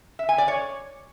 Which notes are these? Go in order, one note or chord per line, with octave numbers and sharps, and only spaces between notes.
E5
G#5
D5
C#5